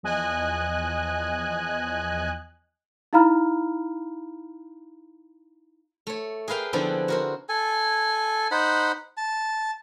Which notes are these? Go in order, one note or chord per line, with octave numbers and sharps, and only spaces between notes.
E2 F3 D#5 G#5 F#6
D#4 E4 F5 A#5 B5 F6
A3 C#5
G#4 A#4 B4 F5 G5
D3 F3 B3 C4 D4 E4
F#4 A#4 C5
A4 G#5
D#4 C5 F#5 B5
A5